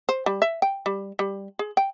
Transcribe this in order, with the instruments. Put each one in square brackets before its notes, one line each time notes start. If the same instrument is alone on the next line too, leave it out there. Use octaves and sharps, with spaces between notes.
[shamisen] C5
G3
E5
G5
G3
G3
G#4
G5